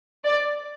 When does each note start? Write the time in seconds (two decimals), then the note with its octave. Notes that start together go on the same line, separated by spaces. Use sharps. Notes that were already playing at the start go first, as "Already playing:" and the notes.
0.24 D5